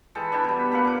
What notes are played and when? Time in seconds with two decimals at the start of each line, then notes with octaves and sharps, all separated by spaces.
0.15 E3 G#3 A4 G5
0.32 D4 E4 G5 A5
0.44 B2 G3
0.59 B5
0.72 A3 A#3 B4 F#5
0.84 A#2 D6